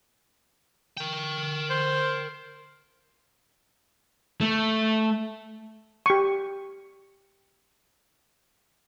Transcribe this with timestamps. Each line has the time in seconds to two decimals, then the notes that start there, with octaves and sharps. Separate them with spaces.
0.97 A#4 G5
1.70 C5
4.41 A3
6.06 G4 C#6